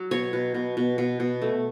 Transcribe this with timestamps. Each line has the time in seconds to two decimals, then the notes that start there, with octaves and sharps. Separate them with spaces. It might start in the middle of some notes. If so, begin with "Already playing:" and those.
Already playing: F#3
0.11 B2 C#5
0.33 B2
0.54 B2
0.77 B2
0.98 B2
1.20 B2
1.42 A3